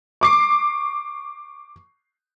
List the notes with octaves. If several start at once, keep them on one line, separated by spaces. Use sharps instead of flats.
C#6 D6 C7